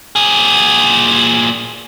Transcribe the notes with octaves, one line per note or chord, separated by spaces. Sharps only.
A#2 G#4